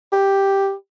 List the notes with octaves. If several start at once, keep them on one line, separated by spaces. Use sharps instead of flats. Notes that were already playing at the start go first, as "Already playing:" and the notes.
G4